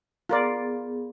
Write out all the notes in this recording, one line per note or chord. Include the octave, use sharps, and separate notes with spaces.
B3 F4 G#4 A#4 D5